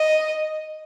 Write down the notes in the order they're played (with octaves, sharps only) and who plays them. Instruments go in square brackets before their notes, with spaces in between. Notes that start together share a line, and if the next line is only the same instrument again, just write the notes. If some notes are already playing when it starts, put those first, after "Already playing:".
Already playing: [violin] D#5